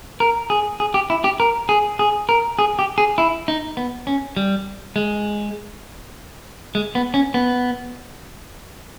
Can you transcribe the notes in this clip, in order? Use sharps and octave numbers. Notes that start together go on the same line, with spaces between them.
A#4
G#4
G#4
G4
E4
G4
A#4
G#4
G#4
A#4
G#4
G4
G#4
E4
D#4
B3
C#4
G3
G#3
G#3
B3
C#4
B3